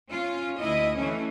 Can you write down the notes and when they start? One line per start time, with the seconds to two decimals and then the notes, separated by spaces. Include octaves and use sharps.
0.11 C#4 F4
0.60 D2 E4 D#5
0.96 E3 A3 C#4